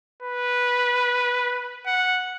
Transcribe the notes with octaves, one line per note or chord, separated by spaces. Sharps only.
B4
F#5